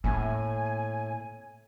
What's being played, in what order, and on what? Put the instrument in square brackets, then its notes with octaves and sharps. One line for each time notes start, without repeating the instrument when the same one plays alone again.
[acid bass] A2 [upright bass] A#3 C4 [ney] G#5